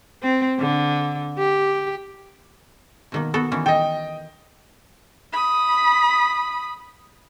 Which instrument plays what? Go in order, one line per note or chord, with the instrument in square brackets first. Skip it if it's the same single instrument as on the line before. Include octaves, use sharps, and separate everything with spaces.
[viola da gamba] C4
D3
G4
[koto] B2 D#3 A#3
B3 F#4 A4
D#3 E3 C#4
[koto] A4 [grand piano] D#5 G5
[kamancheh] B5 D#6